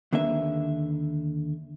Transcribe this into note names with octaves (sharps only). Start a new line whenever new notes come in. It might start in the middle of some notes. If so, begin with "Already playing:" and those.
D#2 D3 A#3 B4 E5